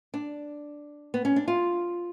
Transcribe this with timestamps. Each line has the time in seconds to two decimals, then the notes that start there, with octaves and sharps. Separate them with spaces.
0.14 D4
1.14 B3
1.25 C#4
1.36 D4
1.48 F4